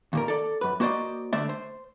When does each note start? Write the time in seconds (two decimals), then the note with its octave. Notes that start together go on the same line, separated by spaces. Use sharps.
0.13 D#2 A#2 A#4
0.28 A4 D5
0.61 F#2 B4
0.80 A#3 F#4 C5 D5 D#5
1.33 D3 A3 C5 D5 E5
1.49 C5